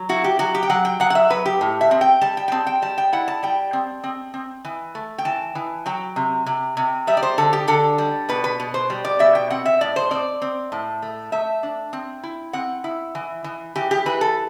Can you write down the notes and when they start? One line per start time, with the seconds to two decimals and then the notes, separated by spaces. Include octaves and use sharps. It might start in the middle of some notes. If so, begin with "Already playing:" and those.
Already playing: F#3
0.09 E4 F#4
0.24 G4
0.39 F#3 F#4
0.55 G4
0.63 G5
0.70 F#3 F#5
0.85 G5
1.00 F#3 F#5
1.10 F#5
1.15 E5
1.30 F#3 B4
1.46 G4
1.61 A2
1.81 E5
1.91 C4
2.01 G5
2.21 G3 A5
2.37 G5
2.48 G5
2.52 C4 A5
2.67 G5
2.82 G3 A5
2.98 G5
3.13 E4 F#5
3.28 A5
3.43 G3 G5
3.73 C4
4.04 C4
4.34 C4
4.65 E3
4.95 A3
5.18 G5
5.25 E3 A5
5.55 E3
5.86 F#3 G5
6.16 C3
6.46 C3
6.77 C3
7.07 G3 E5
7.17 D5
7.23 C5
7.38 D3 A4
7.53 G4
7.68 D3 A4
7.98 G3
8.29 B2 B4
8.44 B4
8.60 B2
8.74 C5
8.90 G3
9.05 D5
9.19 B2 E5
9.35 G5
9.50 C4 F#5
9.66 E5
9.81 A2 D5
9.96 C5
10.11 C4 D5
10.42 C4
10.72 A2
11.02 A3
11.32 A3 E5
11.63 D4
11.93 C4
12.23 E4
12.53 C4 F#5
12.84 E4
13.15 E3
13.44 E3
13.76 E3 G4
13.91 G4
14.06 E3 B4
14.21 A4